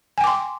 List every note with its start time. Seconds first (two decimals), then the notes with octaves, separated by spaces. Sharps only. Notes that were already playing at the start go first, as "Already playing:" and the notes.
0.18 G#5
0.21 G5
0.24 D6
0.27 C6